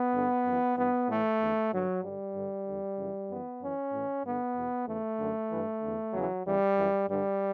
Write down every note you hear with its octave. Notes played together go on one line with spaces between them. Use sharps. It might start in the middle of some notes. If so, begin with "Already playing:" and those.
Already playing: B3
G2 D3
F#2 E3
G2 E3 B3
A2 E3 A3
E2 D3
G2 D3 F#3
G2 D3 G3
G2 D3
E2 D3
F#2 C#3 E3
F#2 E3 B3
F#2 E3 C#4
A2 E3
G2 D3 B3
E2 B2
E2 C#3 E3 A3
F#2 D3
G2 E3
E2 D3
E2 C#3 E3 F#3
E2 C#3 E3 G3
F#2 E3
G2 D3 G3